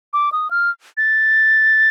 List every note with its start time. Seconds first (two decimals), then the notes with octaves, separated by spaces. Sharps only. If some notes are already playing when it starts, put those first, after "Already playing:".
0.13 D6
0.32 D#6
0.51 F6
0.97 A6